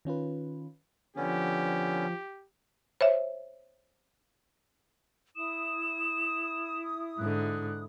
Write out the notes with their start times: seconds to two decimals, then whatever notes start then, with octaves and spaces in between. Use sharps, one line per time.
0.05 D#3 C#4 F4 B4
1.16 D3 F3 B3 C#4 G4
3.01 C5 C#5 E5
5.36 E4 D#6 E7
7.19 G#2 D3 F#6